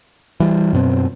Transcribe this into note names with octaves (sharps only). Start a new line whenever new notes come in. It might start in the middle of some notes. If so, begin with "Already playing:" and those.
E3 G3
F#2 B2 C4